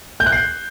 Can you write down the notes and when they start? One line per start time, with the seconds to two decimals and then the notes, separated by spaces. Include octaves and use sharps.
0.20 G6
0.26 F#6
0.32 C7